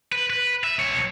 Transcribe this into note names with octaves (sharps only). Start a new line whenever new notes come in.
B4
B4
E5
B1 C#5